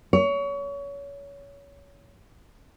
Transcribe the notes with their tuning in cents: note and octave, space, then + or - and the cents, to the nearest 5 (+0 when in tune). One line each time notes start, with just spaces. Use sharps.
C#5 +25